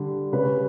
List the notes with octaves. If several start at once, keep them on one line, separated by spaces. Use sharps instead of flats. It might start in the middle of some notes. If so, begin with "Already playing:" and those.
Already playing: D3 G3 D4
C#3 G3 C#4 B4